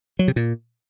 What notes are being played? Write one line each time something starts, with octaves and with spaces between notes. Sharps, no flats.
F#3
C3
A#2